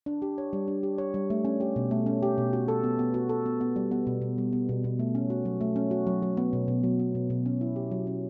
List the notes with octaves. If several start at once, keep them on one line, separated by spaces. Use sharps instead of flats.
D4
G4
C#5
G3
D4
G4
C#5
G3
A3
C#4
G4
B2
A3
C#4
G4
B2
F#4
A4
B3
B3
F#4
A4
B3
B3
G3
B3
B2
B2
G3
B3
B2
B2
A3
C#4
F#4
F#3
A3
C#4
F#4
F#3
F#3
B3
B2
B2
F#3
B3
B2
B2
C#4
E4
G4
F#3
C#4